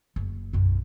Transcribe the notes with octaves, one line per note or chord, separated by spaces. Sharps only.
F#1
B1 F#2